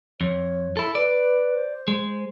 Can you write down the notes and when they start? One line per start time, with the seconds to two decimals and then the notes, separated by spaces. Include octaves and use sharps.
0.21 F2 C#5
0.77 E4 A4
0.95 B4 D5
1.54 C5
1.88 G#3